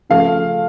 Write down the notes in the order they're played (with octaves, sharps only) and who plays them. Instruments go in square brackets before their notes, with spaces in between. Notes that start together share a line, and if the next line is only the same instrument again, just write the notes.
[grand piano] C#3 F3 A3 [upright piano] F5